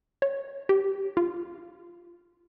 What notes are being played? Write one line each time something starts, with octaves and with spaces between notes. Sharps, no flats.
C#5
G4
F4